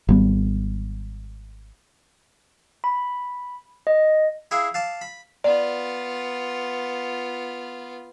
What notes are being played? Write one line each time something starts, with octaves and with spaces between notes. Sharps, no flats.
G#1 G3 B3
B5
D#5
E4 G#4 F5
F5 A5 D6
B5
B3 F4 D5